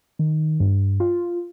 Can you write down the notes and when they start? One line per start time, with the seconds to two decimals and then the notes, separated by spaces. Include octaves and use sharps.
0.19 D#3
0.60 G2
1.00 F4